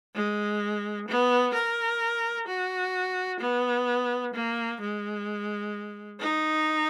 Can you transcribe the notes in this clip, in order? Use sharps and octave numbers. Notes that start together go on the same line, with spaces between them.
G#3
B3
A#4
F#4
B3
A#3
G#3
D#4